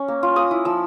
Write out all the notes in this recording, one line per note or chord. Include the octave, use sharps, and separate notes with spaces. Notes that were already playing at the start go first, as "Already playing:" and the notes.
Already playing: C#4
A#3
F4
A#3 D#6
E4
F3 E6